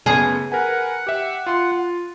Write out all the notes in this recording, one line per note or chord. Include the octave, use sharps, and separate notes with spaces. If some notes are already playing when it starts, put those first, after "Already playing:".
F#2 C#3 B3 G#4
A#4 B4 F#5 G#5
G4 E5
F4 C6